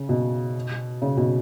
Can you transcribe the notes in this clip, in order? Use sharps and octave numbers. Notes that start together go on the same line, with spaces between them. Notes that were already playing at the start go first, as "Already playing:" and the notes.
Already playing: C#3
B2
C#3
B2